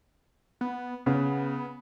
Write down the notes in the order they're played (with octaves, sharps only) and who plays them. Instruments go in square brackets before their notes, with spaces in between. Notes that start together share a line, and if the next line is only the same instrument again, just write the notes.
[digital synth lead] B3
[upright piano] C#3 [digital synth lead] B3